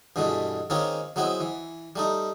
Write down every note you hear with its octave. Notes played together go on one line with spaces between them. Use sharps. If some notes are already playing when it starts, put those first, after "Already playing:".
G2 B2 E3 G#3 A3
D#3 G#3 A#3 C4 C#4 F4
F#3 G#3 B3 C4 E4
E3
G3 A3 D#4